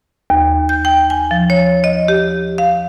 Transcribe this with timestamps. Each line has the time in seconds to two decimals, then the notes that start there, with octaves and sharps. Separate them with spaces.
0.30 D#2
0.69 G6
0.85 G5
1.10 G#5
1.31 F3
1.50 C#5
1.84 D#5
2.08 G4
2.58 F5